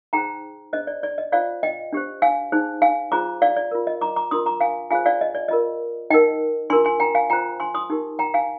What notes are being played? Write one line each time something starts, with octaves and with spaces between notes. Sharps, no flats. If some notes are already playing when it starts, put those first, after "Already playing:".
D#4 G#4 C5 G5 A#5
D4 G#4 C5 D#5
D5
D5
D#5
F4 C5 D5 F5
D#5 G5
D4 G4 C5
F5 G#5
D#4 G#4 C5
F5 G#5
F4 G#4 C5 A#5 D6
D5 F5
D5
F4 A#4
D#5
A#5 D6
A#5 D6
D4 F4 A#4 C6 D#6
A#5 D6
F5 G#5
F4 G#4 C5 F5 G#5
D5 F5
D#5
D5
F4 A#4 D#5
D#4 A#4 D#5 G5
D4 F4 A#4 G#5 C6
G#5 C6
G5 A#5
F5 G#5
F4 C5 G5 A#5
G#5 C6
C6 D#6
D#4 G4 A#4
G5 A#5
F5 G#5